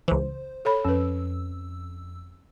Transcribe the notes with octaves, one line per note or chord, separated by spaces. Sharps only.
C#2 E3 C5
A4 C#5 B5
F2 C#4 B4 E6